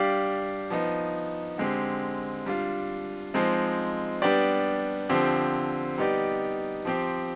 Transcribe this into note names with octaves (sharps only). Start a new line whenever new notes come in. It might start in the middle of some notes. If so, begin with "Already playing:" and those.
Already playing: G3 D4 G4 D5 F5
F3 B3 D#4
D3 G#3 C4 G4
G3 D4 F4
F3 G#3 C4 D#4
G3 B3 D4 G4 D5
D3 F3 C4 G4
G3 B3 D#4 G4 D5
F3 C4 G4